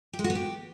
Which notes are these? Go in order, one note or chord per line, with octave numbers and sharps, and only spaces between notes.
G4
G#3
F#4
B3
G4